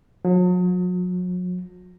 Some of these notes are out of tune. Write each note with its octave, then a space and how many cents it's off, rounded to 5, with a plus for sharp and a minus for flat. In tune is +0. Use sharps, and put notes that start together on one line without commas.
F#3 -40